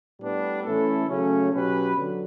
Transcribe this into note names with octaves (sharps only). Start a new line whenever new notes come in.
A2 G3 B3 D4
E3 A3 C#4 E4 A4
C#3 F#3 A3 C#4
B2 F#3 C#4 G4 B4
D3 F#3